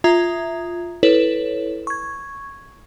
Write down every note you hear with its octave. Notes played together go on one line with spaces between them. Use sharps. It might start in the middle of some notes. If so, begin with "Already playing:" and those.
F4 E5 A#5 D#6 G#6
E4 A4 B4 C#5
C#6 G#6